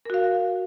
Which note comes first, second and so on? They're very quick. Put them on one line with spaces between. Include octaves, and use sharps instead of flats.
A#4 F#4 F5